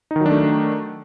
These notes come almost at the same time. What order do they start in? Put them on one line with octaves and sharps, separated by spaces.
D#4 D#3 F#3 D4 A3